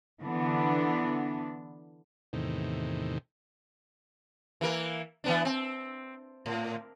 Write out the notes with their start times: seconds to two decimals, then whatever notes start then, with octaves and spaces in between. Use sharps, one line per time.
0.21 D3 E3 B3 D4
2.33 E2 A2 C3 D#3
4.61 E3 A#3 A#4
5.24 E3 B3 D4
5.45 C4
6.46 A2